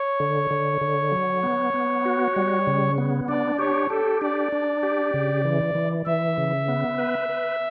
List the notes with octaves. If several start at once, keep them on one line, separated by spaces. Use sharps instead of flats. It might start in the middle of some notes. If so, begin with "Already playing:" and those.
Already playing: C#5
D3
D3
D3
F#3
B3
B3
F#4
G3
C#3
B3
D4 D5
G4 C#5
G4 A4
D4 D5
D4
G4
C#3
E3
E3
E3 E5
C#3
B3
B4
B4